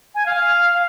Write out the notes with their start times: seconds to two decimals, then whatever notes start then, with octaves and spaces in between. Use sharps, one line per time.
0.15 G#5
0.26 F5